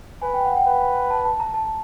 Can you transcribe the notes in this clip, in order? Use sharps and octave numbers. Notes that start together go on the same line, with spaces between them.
B4 G#5
G5
F#5
G5
B4
A5
A5
A#5
A5